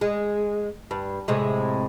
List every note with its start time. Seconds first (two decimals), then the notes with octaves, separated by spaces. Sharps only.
0.01 G#3
0.91 G2
1.28 A2 C3 G#3